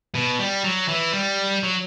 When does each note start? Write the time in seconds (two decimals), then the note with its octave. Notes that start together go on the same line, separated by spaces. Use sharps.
0.14 B2
0.39 G3
0.64 F#3
0.88 E3
1.13 G3
1.63 F#3